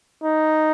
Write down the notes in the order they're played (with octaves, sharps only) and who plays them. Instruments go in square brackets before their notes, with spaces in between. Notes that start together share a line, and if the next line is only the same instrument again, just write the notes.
[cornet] D#4